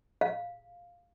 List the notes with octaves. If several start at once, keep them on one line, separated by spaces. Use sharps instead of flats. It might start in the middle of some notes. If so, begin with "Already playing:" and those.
F5